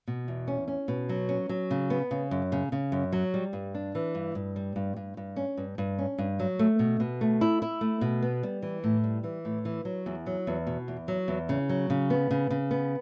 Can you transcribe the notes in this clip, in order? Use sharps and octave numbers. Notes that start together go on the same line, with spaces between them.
B2
E2
C#4
C#4
B2
F#3
C#4
F#3
C#3
B3
C#3
F#2
C#3
C#3
F#2
F#3
G3
G2
D4
E3
G2
G2
G3
G2
G2
G2
C#4
G2
G2
C#4
G2
F#3
A3
B2
B2
A3
E4
E4
A3
B2
B3
G3
E3
A2
G3
E3
A2
E3
F#3
E2
F#3
E2
B2
E2
F#3
E2
C#3
F#3
C#3
B3
C#3
C#3
B3